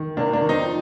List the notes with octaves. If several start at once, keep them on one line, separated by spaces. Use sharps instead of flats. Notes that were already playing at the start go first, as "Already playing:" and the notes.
Already playing: D#3
C3 A#3 D4
A#3 D4
D#3
C4 D#4
F3